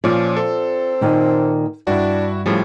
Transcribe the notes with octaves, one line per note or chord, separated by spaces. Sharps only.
A#2 F3 C#4 F4 D5
C4 A4
A#2 D#3 A#3
G2 D4 E4 F#4
A2 C#3 F3 G3